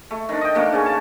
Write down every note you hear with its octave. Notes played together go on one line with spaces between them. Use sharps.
A3
D#3 D4
D#5 G5
D3 A3 A#3 D4
C#3 C#4
A5